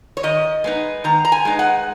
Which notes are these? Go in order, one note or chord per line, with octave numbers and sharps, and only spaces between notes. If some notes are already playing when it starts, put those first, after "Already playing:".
C#5
D#3 D#5
G#3 B3 D#4
D#3 A#5
A#5
G#5
G#3 B3 D#4
F#5